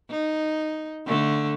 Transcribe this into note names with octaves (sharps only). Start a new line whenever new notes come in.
D#4
D3 A3